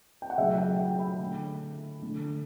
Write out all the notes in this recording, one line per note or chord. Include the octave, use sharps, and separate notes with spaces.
G5
F#5
C#3 F#3 A3 E5
G5
G5
B5
D3 A3
D3 A3